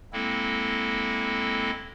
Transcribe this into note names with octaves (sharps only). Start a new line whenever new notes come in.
G#3 A#3 C4 E4 A4